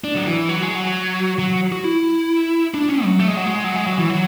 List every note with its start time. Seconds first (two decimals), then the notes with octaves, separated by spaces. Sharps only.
0.04 D4
0.15 F#3
0.27 E3
0.49 F#3
0.62 G#3
0.75 F#3
1.39 F#3
1.72 F#4
1.84 E4
2.74 D4
2.89 C#4
3.05 F#3
3.19 A3
3.28 G#3
3.37 F#3
3.46 G#3
3.64 F#3
3.76 G#3
3.87 F#3
3.98 E3
4.09 F#3